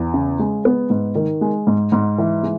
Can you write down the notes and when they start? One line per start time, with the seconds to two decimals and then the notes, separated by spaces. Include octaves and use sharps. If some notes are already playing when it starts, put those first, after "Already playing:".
Already playing: E2
0.14 C#3
0.39 G#3
0.65 B3
0.90 G#2
1.15 D#3
1.41 G#3
1.67 G#2
1.92 G#2
2.18 E3
2.43 G#3